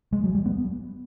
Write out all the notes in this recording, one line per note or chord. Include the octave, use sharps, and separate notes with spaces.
G#3
F#3
G3
B3